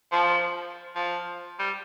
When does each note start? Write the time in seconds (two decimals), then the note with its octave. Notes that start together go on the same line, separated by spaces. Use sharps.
0.12 F3
0.96 F3
1.59 G3